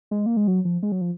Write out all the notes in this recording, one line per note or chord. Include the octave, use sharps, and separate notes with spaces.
G#3
A#3
G#3
F#3
F3
G#3
F#3
F3